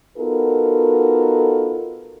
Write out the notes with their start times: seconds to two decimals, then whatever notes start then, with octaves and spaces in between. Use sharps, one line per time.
0.18 B3 D#4 F4 F#4 A4 A#4